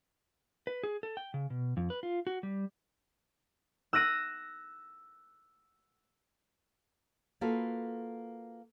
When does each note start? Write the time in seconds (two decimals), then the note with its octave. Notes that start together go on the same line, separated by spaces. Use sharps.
0.67 B4
0.83 G#4
1.03 A4
1.17 G5
1.34 C#3
1.50 B2
1.77 F2
1.90 B4
2.03 F4
2.27 F#4
2.43 G3
3.93 E6 F#6 A#6 D#7
7.41 A#3 F4 F#4 A4 B4